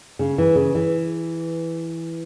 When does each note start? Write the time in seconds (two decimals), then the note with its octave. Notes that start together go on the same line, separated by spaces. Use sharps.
0.19 C#3
0.38 E3
0.55 C#3
0.75 E3